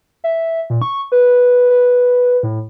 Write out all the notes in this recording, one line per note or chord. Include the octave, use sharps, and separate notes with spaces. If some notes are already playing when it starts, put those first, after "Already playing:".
E5
A#2
C#6
B4
B4
A2